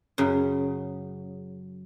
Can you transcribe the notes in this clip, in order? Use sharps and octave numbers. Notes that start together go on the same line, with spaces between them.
F#2 C#3